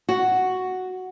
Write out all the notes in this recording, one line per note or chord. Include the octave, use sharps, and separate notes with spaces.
F#4